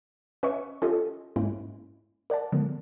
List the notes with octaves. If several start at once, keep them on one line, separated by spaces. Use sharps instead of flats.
C#4 B4 C#5 D#5 E5 C#6
C#4 F4 G4 A4 D#5
G#2 G#3 A#3 C#4 E4
A#4 D5 F#5 A5
D3 F3 G#3 B3